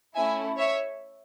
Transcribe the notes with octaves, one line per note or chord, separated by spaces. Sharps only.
A3 C#4 E4 E5 G#5
C#5 E5